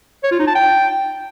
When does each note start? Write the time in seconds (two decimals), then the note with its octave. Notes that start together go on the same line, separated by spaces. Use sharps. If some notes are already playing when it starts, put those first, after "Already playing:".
0.23 C#5
0.31 F4
0.39 D#4
0.47 A5
0.56 G5